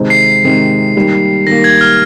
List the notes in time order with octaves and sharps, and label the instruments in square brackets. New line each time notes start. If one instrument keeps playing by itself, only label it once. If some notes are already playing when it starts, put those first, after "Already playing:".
Already playing: [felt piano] C3 D#3 G#3 C4 D#4
[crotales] C7
[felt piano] C3 D#3 G#3 C4 D#4
D#3 G3 A#3
[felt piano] D#3 G3 A#3 [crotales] A#6
[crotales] G#6
F6